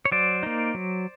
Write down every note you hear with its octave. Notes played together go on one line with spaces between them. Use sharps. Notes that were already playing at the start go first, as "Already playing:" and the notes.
C#5
F#3 C5 D5
A#3 D#4
F#3